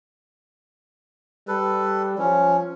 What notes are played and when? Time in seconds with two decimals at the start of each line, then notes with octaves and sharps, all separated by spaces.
1.48 G3 A4 B4
2.18 F3 C#4